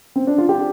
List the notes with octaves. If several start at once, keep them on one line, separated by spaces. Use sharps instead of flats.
C4
D4
F4
G4